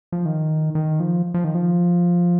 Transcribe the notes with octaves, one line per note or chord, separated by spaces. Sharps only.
F3
D#3
D#3
F3
F3
D#3
F3